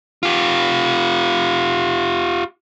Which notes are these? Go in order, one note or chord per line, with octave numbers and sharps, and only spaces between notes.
F4 G4